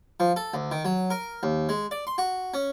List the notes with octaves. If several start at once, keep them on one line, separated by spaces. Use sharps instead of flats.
F3
A4
D2
D#3
F#3
A#4
D#2
G#3
D5
C6
F#4
C#4